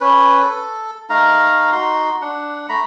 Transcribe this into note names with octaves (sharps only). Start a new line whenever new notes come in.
C#4 B4
A4
A3 D#4 F5 A#5
D#4 F#4 C6
D4 F#5
A3 A#5 B5